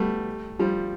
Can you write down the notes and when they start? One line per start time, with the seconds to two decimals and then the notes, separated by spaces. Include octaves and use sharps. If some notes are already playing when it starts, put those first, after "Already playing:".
Already playing: G3 A3 B3
0.59 F3 G3